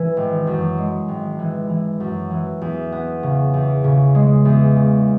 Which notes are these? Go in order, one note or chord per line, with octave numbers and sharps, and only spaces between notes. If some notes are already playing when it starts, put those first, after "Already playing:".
Already playing: E3
G#1
F#2
G#3
G#1
E3
E3
F#2
E3
E2
B3
C#3
E2
C#3
G#3
E2
C#3